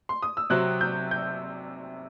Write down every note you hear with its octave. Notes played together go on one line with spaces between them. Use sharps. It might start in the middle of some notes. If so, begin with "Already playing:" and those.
C6
D#6
E6
C3 F#3 C4 F#6
G6
G6